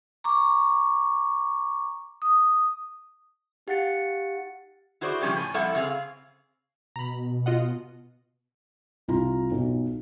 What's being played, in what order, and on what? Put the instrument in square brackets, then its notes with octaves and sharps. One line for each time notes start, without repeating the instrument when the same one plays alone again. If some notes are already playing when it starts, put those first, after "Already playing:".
[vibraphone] A#5 C#6 D6
D#6
[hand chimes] D#4 G4 F5 F#5 A6 C#7
[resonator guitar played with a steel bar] E4 F#4 G#4 C5 D5
C#3 F3 G3 C#4 G4
A2 G#5
F2 G3 E4 A4 E5 F#5
C#3 C4 G#4 F5
[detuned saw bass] B2 [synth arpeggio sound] A#5 B5
[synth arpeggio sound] F4 D#5 F#5
[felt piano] C2 F4 A#5
B1